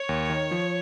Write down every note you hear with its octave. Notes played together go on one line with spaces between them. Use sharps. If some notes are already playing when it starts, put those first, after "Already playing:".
Already playing: C#5
D#2
D#3
F3